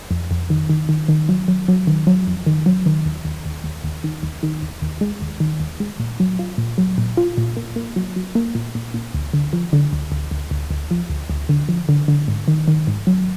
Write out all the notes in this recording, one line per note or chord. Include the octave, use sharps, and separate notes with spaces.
F2
F2
D#3
D#3
D#3
D#3
F#3
F#3
F#3
D#3
F#3
F2
D#3
F#3
D#3
D#2
D#2
D#2
D#2
D#2
D#3
D#2
D#3
D#2
D#2
G#3
D#2
D#3
D#2
G#3
A#2
F#3
F4
A#2
F#3
A#2
F4
A#2
A#3
A#3
F#3
F#3
A#3
A#2
A#2
A#2
D2
D3
F3
D3
D2
D2
D2
D2
D2
F3
D2
D2
D3
F3
D3
D3
G#2
D#3
D#3
G#2
F#3